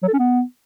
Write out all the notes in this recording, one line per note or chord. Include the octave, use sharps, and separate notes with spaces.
F#3
A4
C#4
B3